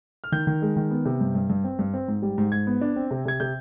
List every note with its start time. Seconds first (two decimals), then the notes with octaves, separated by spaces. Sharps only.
0.24 F6
0.32 D#3 G6
0.47 D#3
0.62 G#3
0.77 D#3
0.91 B3
1.05 C3
1.21 G2
1.35 G2
1.50 G2
1.64 C4
1.79 G2
1.94 C4
2.08 G#2
2.22 G3
2.38 G#2
2.52 G#2 G#6
2.67 B3
2.81 D4
2.96 C4
3.11 C3
3.25 C3 G#6
3.40 C3 G6